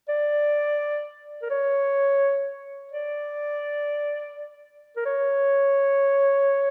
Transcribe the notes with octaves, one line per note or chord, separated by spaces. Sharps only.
D5
A#4
C#5
D5
A#4
C#5